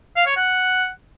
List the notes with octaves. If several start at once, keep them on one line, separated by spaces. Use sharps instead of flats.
F5
C#5
F#5